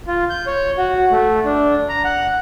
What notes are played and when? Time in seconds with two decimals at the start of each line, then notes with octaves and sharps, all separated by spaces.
0.07 F4
0.30 G6
0.47 C#5
0.78 F#4
1.11 A3
1.45 D4
1.89 A#5
2.04 F#5